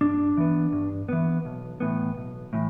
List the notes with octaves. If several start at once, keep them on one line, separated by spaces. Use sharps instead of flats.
G2 D4
E3 B3
G2
E3 B3
B1
A2 E3 B3
B1
A2 E3